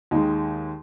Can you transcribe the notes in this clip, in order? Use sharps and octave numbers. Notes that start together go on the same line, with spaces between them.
D#2 D#3 G#3 D#4